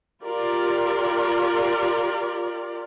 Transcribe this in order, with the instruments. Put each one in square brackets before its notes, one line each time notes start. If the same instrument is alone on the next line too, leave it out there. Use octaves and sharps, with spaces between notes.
[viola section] F4 G4 A#4 D5